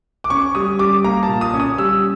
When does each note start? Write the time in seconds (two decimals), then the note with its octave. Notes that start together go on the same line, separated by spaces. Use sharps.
0.24 D6
0.30 C#4 C#6
0.55 G3 D#6
0.79 G3 D6
1.04 A#3 A#5
1.23 A5
1.28 A#2
1.41 D#6
1.54 C#4
1.60 D#6
1.78 G3 E6